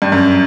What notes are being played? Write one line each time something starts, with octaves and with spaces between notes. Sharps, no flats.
G2
F#2